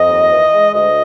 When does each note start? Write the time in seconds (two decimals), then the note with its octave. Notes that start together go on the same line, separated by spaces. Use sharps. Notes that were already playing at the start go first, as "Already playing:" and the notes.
Already playing: F2 D#5
0.09 D#2
0.31 E3
0.52 G#3
0.74 D2 D#5